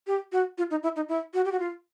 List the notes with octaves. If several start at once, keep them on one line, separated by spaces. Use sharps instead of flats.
G4
F#4
F4
D#4
E4
D#4
E4
F#4
G4
F#4
F4